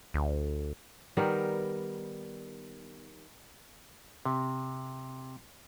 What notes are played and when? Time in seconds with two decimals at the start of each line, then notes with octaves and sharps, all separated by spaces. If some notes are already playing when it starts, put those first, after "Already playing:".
0.14 D2
1.17 D#3 G3 B3 A#4
4.25 C3